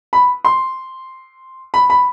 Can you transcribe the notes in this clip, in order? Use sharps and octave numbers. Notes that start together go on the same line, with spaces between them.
B5
C6
B5
B5